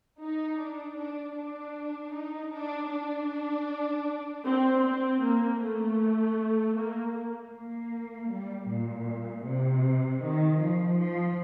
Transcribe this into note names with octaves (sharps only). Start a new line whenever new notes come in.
D#4
D4
D4
D4
D#4
D4
D4
C4
C4
A#3
A3
A#3
A#3
G3
A#2
C3
D#3
F3
F3